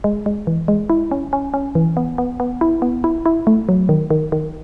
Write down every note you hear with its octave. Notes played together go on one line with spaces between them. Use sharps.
G#3
G#3
E3
G#3
E4
C#4
C#4
C#4
E3
B3
B3
B3
E4
B3
E4
E4
A3
F#3
D#3
D#3
D#3